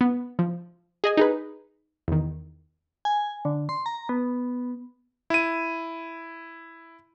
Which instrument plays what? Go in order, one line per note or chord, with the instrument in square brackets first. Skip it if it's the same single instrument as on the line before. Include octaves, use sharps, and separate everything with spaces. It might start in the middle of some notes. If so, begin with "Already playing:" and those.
[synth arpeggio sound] B3
F3
G#4 D#5 G#5
D#4 G#4 B4
E2 D#3
[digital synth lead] G#5
D3
C6
A#5
B3
[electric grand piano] E4 D#7